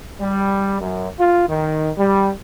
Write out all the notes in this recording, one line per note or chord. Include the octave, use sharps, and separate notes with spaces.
G3
F#2
F4
D#3
G3